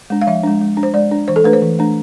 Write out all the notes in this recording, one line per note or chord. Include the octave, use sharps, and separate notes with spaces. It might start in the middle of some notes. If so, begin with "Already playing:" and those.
G#3 D4
F5
F3 E5
G#3 D4
G#3
D4
C5
G#3 D5
D4
E3 C5
A4
A3 D4 B4
C5
E3
A3 D4